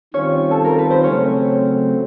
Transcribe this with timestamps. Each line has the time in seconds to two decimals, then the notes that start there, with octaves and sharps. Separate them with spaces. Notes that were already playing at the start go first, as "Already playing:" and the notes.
0.14 D#3 G3 C4 C#4 F4 C#5
0.51 A4
0.65 A#4
0.79 B4
0.91 C5
1.04 C#3 F#3 A3 C4 C#4 C#5